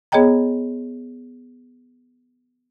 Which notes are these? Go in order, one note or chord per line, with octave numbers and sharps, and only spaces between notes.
B3 G#4 C#5 D#5 G5 A#5